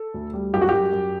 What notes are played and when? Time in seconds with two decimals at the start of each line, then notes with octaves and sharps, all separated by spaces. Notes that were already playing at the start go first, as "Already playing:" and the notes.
Already playing: A4
0.14 D2
0.33 G3
0.53 F#2 G4
0.61 F#4
0.69 F#2 G4
0.93 F#2